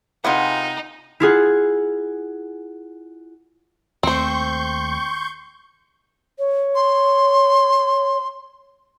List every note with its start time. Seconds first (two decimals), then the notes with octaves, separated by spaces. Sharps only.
0.25 C3 D#4 F4 G#4 B4 F#5
1.20 E4 F4 G#4 F#5
4.03 D#2 A3 C4 C5 C6 C#6 G6
6.38 C#5
6.75 C6